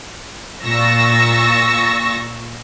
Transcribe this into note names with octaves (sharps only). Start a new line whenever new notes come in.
A#2 C#6 E6 A6 A#6